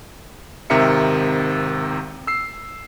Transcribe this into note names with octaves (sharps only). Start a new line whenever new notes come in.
G#1 C3 D#3 A#4 E5 C#7
E6 C7